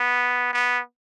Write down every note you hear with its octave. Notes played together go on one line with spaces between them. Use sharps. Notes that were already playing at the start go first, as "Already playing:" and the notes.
Already playing: B3
B3